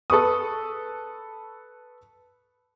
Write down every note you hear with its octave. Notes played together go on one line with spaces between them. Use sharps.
A4 B4 C#6 D#6